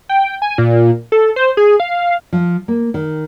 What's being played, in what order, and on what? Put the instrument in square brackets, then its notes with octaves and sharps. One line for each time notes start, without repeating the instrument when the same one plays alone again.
[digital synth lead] G5
G#5
A#2
A4
C5
G#4
F5
[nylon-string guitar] F3
A#3
D#3